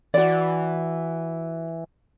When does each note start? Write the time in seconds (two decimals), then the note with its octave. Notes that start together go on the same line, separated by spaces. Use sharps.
0.14 E3 F#4 D5